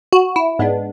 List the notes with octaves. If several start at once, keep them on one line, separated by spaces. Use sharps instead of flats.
F#4
E4
G#2 G#3 B3 D4